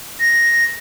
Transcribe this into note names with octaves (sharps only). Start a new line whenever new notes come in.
A#6